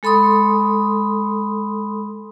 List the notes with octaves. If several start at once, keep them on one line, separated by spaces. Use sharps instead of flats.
G#3 A4 B5 C6 D#6